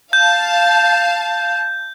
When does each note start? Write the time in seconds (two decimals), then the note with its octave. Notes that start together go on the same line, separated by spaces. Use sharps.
0.13 F5 A5 G6